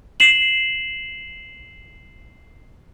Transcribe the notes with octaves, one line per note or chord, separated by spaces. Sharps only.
C7 E7 F#7